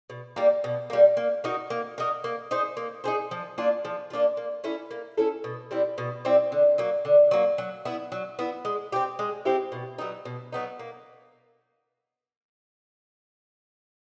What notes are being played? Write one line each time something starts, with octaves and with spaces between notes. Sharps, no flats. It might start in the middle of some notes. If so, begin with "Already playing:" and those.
B2
G3 A#3
B2
G3 A#3
A#3
D#4 F#4 A#4
A#3
D#4 F#4 A#4
A#3
D#4 G#4 C5
A#3
D#4 G#4 C5
F3
A#3 D4 F4
F3
A#3 D4 F4
A#3
C#4 E4 A4
A#3
C#4 E4 A4
B2
G3 C4 E4
B2
G3 C4 E4
D3
F#3 A#3
D3
F#3 A#3
F#3
B3 E4
F#3
B3 E4
G#3
C4 E4 G4
G#3
C4 E4 G4
B2
F#3 B3 D#4
B2
F#3 B3 D#4
A#3